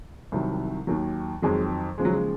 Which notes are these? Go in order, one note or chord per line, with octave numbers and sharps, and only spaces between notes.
C2 C3 D#3 F#3
D#2 D#3 F#3
F2 D#3 F#3 G#3
D#2 C#3 F3 G#3
F#3
G#3